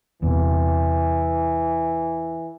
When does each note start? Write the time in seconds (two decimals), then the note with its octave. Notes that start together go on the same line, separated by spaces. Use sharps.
0.23 E2 C3 E3